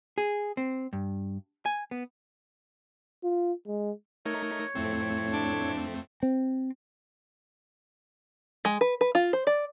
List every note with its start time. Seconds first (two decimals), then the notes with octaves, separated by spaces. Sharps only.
0.18 G#4
0.57 C4
0.93 G2
1.66 G#5
1.91 B3
3.23 F4
3.67 G#3
4.26 A3 D#4 A#4 C#5
4.75 F2 A2 A3 C4
5.32 D4
6.23 C4
8.65 G#3
8.81 B4
9.01 B4
9.15 F4
9.33 C5
9.47 D5